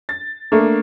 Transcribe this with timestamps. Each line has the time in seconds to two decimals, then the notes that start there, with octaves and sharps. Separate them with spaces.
0.09 A6
0.52 A3 A#3 D4